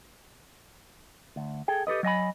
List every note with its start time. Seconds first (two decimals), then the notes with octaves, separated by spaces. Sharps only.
1.36 D2
1.68 G#4 A4 G5
1.87 G4 A4 B4 D#5
2.03 F#3 D#5 G#5 B5